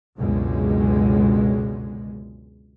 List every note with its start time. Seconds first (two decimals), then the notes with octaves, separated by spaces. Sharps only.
0.17 C#2 F#2 B2 D3 G#3